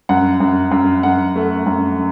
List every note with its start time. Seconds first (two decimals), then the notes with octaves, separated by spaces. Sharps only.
0.09 F#2 F#5
0.40 F#2
0.71 F#2
1.03 F#2 F#5
1.36 A3
1.66 F#2